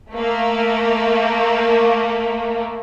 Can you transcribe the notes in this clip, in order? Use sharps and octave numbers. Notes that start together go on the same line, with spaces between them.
A3 A#3